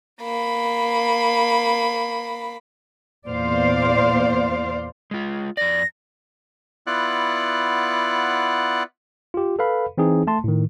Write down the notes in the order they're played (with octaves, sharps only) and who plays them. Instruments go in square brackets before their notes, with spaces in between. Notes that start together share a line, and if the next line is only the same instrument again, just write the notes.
[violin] A#3 B5
[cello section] E2 A#2 C5 D5 F5
[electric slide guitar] G#3 F4
[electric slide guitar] F2 D5 [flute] A#6
[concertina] B3 E4 F4 D5 F#5 F#6
[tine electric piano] F4 G4
A4 B4 F5 B5
E3 C4 D#4 G#4
A3 A5 C6
A2 D#3